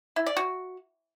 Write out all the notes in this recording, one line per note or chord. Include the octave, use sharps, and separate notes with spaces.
E4
D5
F#4